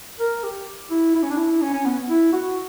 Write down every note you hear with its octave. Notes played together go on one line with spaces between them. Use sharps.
A#4
G4
E4
E4
C#4
D4
E4
C#4
C#4
B3
E4
F#4